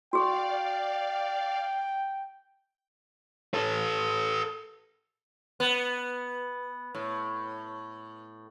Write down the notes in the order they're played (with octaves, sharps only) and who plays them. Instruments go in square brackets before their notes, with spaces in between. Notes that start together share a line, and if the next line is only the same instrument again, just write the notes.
[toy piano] F#4 G#4 C#6 [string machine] D5 F5 [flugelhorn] G5
[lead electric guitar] A4 B4
[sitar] B3
A2